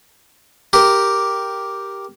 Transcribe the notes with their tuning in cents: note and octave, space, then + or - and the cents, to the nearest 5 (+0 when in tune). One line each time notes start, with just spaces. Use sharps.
G4 -5 A#4 +0